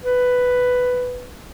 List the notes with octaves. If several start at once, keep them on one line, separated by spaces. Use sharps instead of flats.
B4